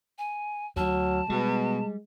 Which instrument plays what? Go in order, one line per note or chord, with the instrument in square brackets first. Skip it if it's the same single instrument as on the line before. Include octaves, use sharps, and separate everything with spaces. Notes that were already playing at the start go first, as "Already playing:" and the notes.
[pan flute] G#5
[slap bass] D2 [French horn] F#3 [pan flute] A5
[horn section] B2 [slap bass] G3 [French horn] G#3